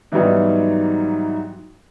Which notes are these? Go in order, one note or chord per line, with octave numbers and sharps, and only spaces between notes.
G#2 E3 F#3 G3 B3 D#4